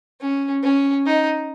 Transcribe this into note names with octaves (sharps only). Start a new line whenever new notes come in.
C#4
C#4
D#4